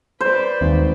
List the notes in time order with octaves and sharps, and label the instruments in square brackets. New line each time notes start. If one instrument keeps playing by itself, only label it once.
[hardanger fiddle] B4 D5 [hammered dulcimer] C5
[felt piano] G#1 [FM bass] D#2